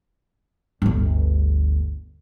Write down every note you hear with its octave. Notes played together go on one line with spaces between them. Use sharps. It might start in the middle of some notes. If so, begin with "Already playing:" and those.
G1 D2